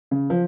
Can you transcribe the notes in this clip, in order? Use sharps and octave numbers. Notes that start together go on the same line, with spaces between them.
C#3
F3